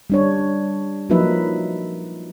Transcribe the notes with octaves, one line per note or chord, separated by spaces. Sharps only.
G3 D4 C#5
F3 F#3 A#3 D#4 B4 E5